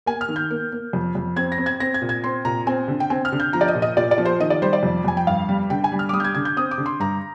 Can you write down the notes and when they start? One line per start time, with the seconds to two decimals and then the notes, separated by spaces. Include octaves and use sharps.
0.06 A#3 G#5
0.21 F6
0.29 D#3
0.36 G6
0.51 A#3
0.72 A#3
0.93 F2
1.15 F2
1.36 C4 G#6
1.52 A#6
1.58 C4
1.66 G#6
1.80 C4 A#6
1.94 G#6
2.02 A#2
2.09 G#6
2.24 C4 C6
2.45 A#2 A#5
2.67 C4 G#5
2.88 D3
3.00 G5
3.10 C4 G#5
3.25 F6
3.32 D3
3.40 G6
3.53 F3 A#5
3.61 D5
3.68 D#5
3.75 A#2
3.82 D#5
3.97 A#2 D5
4.11 D5
4.18 F3
4.25 C5
4.40 D#3 D#5
4.50 D5
4.62 G3 C5
4.73 D5
4.83 F2
5.05 F2 G#5
5.17 G5
5.27 G2 F5
5.49 G3
5.70 D3 G5
5.84 G#5
5.92 G3
5.99 F6
6.09 D6
6.13 G3 D#6
6.20 G6
6.24 G#6
6.34 D3 G#6
6.45 G6
6.57 C4 D#6
6.71 D6
6.78 D3
6.86 C6
7.00 G2 A#5